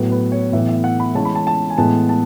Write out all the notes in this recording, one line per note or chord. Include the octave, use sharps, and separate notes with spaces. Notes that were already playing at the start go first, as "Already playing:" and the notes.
Already playing: A2 F#3 B3 B4
B4
C#5
A2 E3 B3 E5
E5
F#5
B5
E3 G#3 C#4 A5
B5
A5
A5
G#5
A2 E3 G#3 B3 A5
A5